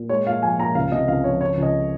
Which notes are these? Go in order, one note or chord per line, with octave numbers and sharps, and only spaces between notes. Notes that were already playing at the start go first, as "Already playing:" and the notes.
Already playing: A#2
G#3 C#5
A#2 F5
F3 G#5
A#2 A#5
C#2 F5
C3 D#5
C#2 F5
F3 C#5
C#2 C#5
C#2
D#5